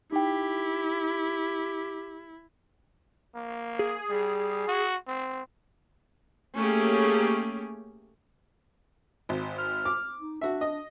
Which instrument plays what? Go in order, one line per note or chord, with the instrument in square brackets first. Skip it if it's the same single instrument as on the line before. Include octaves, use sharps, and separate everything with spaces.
[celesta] D#4 G5 [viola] E4 [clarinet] G4
[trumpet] A#3
[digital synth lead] G#4
[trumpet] G3
F#4
C4
[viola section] A3 A#3 C#4 G4 G#4
[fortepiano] G#1
[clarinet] F6
[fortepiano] D6
[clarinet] D#4
[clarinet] D4 [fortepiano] F#4 E5
[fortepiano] D#5